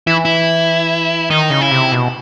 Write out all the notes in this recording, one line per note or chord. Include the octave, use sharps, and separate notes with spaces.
E3 E4
E4
D#3 D#4
C#3
E4
C3
B2